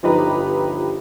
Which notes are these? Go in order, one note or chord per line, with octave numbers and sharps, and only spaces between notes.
G1 F3 D#4 G4 B4 A#5